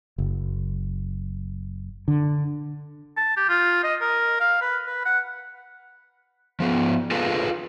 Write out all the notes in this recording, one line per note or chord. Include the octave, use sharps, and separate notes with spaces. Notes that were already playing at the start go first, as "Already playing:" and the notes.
F#1
D3
A5
G4
F4
D#5
A#4
F5
B4
B4
F#5
F3 B3
F4 G#4 A4 B4 D#5 F5